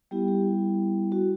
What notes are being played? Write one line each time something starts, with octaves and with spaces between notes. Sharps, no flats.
G3 B3 E4 G4
G4
F#4